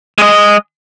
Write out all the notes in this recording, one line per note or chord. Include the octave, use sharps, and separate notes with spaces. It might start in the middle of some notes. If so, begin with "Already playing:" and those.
G#3 D#5